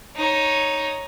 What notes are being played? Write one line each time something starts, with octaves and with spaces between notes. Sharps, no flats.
D#4 C#5